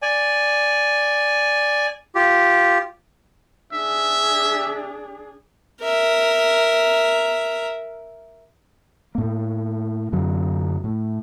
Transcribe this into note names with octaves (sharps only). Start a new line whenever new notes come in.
D5 G#5
F4 G4
D4 G#4 E5
A#4 E5
A2 A#3
F#2 D3 F#3
A2